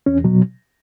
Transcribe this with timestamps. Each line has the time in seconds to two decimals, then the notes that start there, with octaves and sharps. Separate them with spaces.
0.06 E2 C#4
0.24 B2 F#3